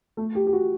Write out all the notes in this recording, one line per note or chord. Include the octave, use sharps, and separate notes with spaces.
A3
G4
G4
F#4